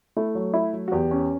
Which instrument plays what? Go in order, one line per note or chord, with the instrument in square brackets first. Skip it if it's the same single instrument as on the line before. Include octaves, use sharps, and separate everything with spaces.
[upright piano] A3 [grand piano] E4
[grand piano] F#3
E4
F#3
[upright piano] F#4
[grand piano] E2 [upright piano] G4
[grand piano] C#4